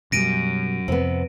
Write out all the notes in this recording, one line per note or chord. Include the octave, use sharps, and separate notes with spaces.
F#2 B2 G3 A#6 D7 D#7
F2 C3 B3